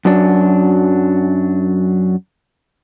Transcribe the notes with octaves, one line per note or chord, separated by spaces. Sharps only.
F#2 F#3 D4